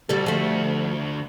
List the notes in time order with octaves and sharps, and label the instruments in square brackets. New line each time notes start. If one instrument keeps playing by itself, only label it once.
[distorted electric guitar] D2 F#4 [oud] G3 A4
[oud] F3 A3